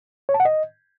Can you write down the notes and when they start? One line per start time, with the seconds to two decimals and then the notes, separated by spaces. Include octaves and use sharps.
0.29 C#5
0.34 A5
0.40 F#5
0.45 D#5